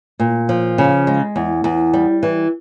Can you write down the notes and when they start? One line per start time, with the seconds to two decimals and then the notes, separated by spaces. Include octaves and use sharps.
0.20 A#2
0.49 F3
0.78 C#3
1.07 G#3
1.36 E2
1.64 E2
1.94 G3
2.23 E3